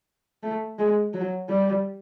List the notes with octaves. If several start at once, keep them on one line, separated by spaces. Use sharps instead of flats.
A3
G#3
F#3
G3